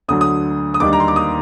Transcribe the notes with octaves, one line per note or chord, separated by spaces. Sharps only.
D2 D3 F#3 D#6
D#6
D#6
D#2 D#3 G3 D4 D6
A#5
C6
D6
D#6